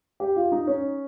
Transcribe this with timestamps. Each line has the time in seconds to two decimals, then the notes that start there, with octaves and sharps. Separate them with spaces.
0.20 G4
0.36 F4
0.52 D#4
0.67 C#4